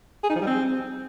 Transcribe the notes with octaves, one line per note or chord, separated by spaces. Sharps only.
G#4
D#4
F3
G3
C4